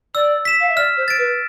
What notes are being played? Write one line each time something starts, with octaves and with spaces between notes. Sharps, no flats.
D5 E6
B6 E7
F5
E5
D5 F6
C5
A6 D7
B4